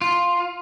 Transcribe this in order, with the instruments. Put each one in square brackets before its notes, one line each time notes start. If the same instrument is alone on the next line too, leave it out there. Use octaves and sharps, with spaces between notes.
[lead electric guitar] F4